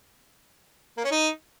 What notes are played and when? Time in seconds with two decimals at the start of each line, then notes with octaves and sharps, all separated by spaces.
0.97 A#3
1.04 C#4
1.11 D#4